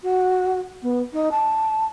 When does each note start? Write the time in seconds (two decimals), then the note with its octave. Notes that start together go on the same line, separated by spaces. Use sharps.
0.03 F#4
0.83 B3
1.13 D#4
1.31 A5